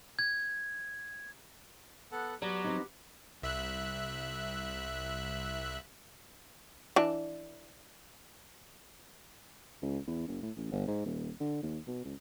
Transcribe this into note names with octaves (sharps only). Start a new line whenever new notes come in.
G#6
B3 A4 F#5
F#3 B3 G4 D5
C4 D#4
C2 E5 F#6
E3 D4
C#2
E2
F#1
A2
A1
G1
G#2
D#1
D3
D#2
B2
C#2